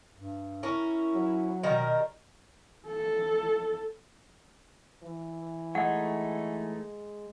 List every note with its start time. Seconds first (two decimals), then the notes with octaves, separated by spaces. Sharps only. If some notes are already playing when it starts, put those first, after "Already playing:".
0.16 G2
0.63 C#4 E4 A#4
1.14 F#3
1.63 B2 D#3 G3 A#4
2.87 A4
5.03 E3
5.75 G#3 A3 D#4 C#5 F#5